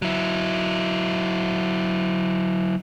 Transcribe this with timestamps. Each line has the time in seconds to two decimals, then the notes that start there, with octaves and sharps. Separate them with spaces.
0.02 F#3 E4